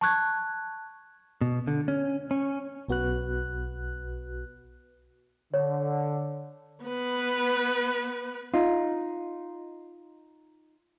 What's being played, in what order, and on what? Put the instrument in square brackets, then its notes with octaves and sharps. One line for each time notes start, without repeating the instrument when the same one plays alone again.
[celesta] A5 C#6 F#6 G#6
[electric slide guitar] B2
D3
C#4
C#4
[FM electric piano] B1 B3 F#4 B4 F#6
[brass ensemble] D3 [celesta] C#5
[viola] B3 B4
[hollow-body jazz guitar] D#4 F4